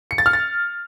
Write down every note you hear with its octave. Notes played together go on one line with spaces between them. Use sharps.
C#7
A6
F6
A6